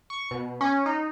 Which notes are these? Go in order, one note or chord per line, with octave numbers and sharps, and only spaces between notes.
C#6
B2
C#4
D#4